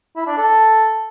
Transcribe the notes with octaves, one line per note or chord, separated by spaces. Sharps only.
E4
D4
A4